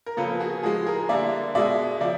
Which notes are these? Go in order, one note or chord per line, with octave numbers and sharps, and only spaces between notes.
A#4
C#3 F3 A#3 A4 B4
F#4 G#4
A2 F3 G#3 F#4 G#4
G#4 A#4
D3 G3 A#3 D5 E5
B2 G#3 D5 E5
C#3 F3 D5 E5